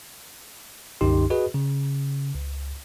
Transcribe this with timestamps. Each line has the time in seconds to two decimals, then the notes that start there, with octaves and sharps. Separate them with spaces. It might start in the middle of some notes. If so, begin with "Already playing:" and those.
1.01 C2 F#2 D3 D#4 G4 C6
1.30 F#4 G#4 B4 D#5
1.54 C#3
2.35 C#2